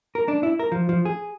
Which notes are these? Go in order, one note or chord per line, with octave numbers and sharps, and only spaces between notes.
A#4
D4
E4
A#4
F3
F3
G#4